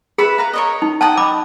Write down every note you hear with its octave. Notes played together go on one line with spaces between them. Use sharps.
G#4 B4 E5 B5
B4 F5 A#5
A#4 C#5 D#5
D#4
D#5 F#5 G5 A5
B5 D6